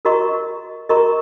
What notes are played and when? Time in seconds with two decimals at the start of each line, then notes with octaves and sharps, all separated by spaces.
0.05 F#4 A#4 D#5 A#5 C#6
0.89 F#4 A#4 D#5 A#5 C#6